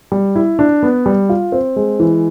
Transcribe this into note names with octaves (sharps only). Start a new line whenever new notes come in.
G3
E4
D4
B3
G3
F4
C4
G#3
E3